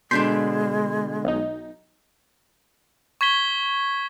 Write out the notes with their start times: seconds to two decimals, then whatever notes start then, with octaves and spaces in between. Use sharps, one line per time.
0.11 B2 D3 G#3 D4 C6 G6 B6
1.25 B1 D#4
3.21 C#6 G#6 B6 G7